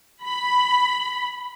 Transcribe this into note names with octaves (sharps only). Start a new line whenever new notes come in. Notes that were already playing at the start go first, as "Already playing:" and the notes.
B5